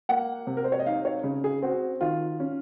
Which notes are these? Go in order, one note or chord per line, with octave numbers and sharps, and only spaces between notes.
A#3 F#5
C3
A#4
C5
C#5
D#5
D#4 F5
C#5
C#3
G#4
C4 F#4
D#3 F4
C#4